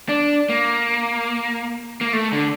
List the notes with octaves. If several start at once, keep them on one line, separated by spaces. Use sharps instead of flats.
D4
A#3
A#3
A3
D3